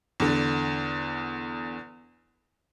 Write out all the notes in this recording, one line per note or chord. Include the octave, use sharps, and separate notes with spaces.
E2 D3